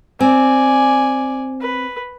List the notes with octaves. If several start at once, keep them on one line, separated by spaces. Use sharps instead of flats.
C4 D5 G#5
B4